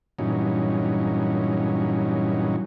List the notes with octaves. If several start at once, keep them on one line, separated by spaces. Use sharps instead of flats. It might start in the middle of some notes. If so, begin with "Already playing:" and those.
G2 A#2 E3 F#3 C#4 D#4